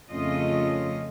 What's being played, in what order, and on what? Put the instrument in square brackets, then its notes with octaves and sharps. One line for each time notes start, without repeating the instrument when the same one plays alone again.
[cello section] F2 C#3 A3 C#4 F4 D#5